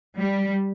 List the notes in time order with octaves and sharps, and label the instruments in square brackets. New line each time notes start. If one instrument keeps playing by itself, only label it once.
[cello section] G3